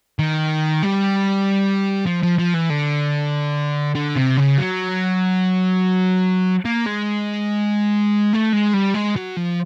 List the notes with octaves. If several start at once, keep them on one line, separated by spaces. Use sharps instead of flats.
D#3
G3
F3
F3
F3
E3
D3
D3
C3
C#3
F#3
A#3
G#3
A3
G#3
G3
G#3
F#3
F3